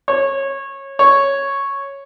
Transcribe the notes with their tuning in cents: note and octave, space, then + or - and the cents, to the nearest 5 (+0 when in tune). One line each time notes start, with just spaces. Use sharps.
C#5 -20
C#5 -5